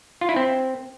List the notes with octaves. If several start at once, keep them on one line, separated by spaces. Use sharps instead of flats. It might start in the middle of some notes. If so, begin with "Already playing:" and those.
F4
E4
C4